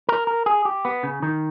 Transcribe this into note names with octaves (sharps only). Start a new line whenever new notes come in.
A#4
A#4
G#4
G4
B3
C#3
D#3